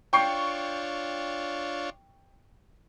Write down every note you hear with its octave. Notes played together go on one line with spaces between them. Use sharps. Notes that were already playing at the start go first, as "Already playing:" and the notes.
D4 F4 C#5 G5 C#6 C7